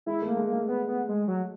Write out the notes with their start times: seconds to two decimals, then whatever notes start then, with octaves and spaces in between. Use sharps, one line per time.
0.06 G#3 E4
0.22 A3
0.27 A#3
0.37 G#3
0.47 A#3
0.52 G#3
0.68 B3
0.88 B3
1.08 G#3
1.28 F#3